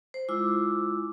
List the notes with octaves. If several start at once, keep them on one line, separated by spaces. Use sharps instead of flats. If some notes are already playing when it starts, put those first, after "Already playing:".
C5
G#3 E4 F4 D6 E6